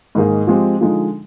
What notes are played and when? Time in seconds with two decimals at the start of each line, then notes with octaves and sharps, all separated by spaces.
0.15 G#2 D#3 A#3 D#4 G#4
0.47 F3 G#3 C4 G4
0.81 D3 F3 G#3 D#4